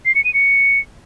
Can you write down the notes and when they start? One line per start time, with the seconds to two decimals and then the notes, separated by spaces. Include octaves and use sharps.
0.06 C7
0.15 C#7
0.24 D#7
0.34 C#7